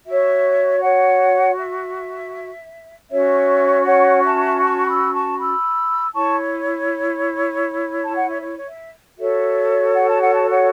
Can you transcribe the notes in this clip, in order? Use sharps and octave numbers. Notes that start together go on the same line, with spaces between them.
F#4 C#5 E5
C#5 F#5
E5
C#4 F#4 C#5 E5
C#5 F#5
E5 A5
A5 C#6
B5 E6
A5 C#6
B5 E6
E4 C#5 A5 C#6
A5
F#5
E5
C#5
C#5
E5
F#4 A4 C#5 E5
F#5
A5
F#5
A5
C#5 F#5